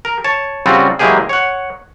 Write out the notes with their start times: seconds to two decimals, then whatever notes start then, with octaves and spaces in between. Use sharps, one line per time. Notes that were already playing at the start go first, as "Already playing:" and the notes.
0.05 A#4
0.24 C#5 A5
0.66 C#3 G3 C4 F4 F#4
0.99 E3 F#3 G#3 A#3 G4 G#4
1.29 C#5 F#5